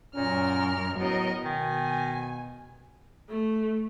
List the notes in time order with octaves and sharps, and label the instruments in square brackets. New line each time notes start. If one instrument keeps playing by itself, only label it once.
[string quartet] F#2 A#4 F6 [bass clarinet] A#2 [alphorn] C#4
[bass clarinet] A2 [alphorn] F#3 [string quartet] B3 A#4 D#5
[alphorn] B2 [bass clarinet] D#3 [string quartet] G#5
[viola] A3